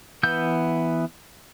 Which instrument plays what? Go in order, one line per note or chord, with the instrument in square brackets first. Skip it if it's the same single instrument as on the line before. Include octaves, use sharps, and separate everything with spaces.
[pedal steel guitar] E3 B3 E6 G6